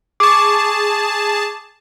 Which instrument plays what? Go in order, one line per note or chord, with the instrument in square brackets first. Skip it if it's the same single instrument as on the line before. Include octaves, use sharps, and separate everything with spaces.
[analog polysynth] G#4 A5 [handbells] C#6 D6